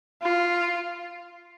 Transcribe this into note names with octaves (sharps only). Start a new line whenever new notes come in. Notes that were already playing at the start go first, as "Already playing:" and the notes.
F4